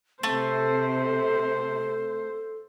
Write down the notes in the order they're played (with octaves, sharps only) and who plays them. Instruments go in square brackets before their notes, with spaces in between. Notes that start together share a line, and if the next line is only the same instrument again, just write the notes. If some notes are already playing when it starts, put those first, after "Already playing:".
[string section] C3 [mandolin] A3 [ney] A4 [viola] C5